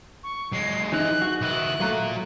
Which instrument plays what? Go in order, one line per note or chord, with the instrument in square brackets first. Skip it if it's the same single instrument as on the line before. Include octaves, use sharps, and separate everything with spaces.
[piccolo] C#6
[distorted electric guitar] F#3 G#3 [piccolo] C7
[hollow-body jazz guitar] E3 D#4 [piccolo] F#6
[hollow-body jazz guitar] F#4
[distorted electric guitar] D#3 E4 [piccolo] F#6
[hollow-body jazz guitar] F#3 A3 [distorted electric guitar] F4 A#5